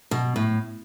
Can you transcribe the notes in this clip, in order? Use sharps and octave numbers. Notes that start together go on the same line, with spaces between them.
B2
A2